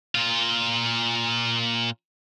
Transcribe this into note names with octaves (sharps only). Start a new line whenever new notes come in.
A#2 F4